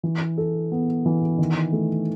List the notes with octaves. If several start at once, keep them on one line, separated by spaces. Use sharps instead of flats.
E3
A4
B3
E3
D#3
A3